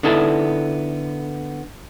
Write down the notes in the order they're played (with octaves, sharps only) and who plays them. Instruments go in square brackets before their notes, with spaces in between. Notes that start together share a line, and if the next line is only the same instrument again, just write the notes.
[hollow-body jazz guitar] D3 B3 D#4 E4 A4 A5